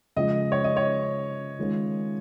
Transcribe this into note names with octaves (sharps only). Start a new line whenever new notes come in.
C#3 F3 G#3 F4 D#5
C#5
D#5
C#5
D#3 G#3 C#4 F4